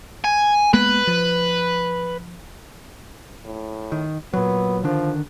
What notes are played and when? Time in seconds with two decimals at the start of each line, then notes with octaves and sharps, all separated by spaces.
0.24 G#5
0.73 G#3 A#3 B3 B4
1.07 F3
3.45 A2
3.92 D#3
4.34 A#2 F#3 B3
4.84 D3 D#3 F3 D4